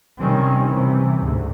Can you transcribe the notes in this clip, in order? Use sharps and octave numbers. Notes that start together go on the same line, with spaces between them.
C3 D#3 G3 C4 C#4
C3 E3
D2 G#2